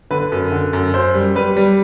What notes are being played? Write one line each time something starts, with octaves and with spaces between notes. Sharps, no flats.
D3 B4
F#2
D3
F#2
F#2 C5
G3
G3 B4
G3